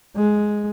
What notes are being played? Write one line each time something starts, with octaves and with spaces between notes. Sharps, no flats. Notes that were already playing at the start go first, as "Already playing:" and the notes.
G#3